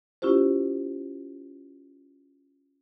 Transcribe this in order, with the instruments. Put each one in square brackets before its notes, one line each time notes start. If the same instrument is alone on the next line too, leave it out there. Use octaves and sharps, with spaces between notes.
[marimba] C#4 E4 F4 G4 C5